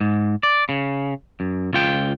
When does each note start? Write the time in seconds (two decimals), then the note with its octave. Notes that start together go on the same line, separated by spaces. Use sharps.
0.01 G#2
0.43 D5
0.69 C#3
1.40 F#2
1.73 C#2 F4 G5